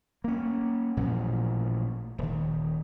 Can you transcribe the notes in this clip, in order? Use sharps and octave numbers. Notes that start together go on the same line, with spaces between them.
A#3 C#4
A1 A#2 F3 F#3
D#1 D#3